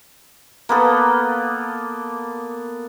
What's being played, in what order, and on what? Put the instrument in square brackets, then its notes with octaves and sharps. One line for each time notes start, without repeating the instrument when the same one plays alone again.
[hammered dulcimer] A#3 B3 A4